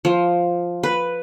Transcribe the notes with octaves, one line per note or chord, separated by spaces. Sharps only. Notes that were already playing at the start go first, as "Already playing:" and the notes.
F3
B4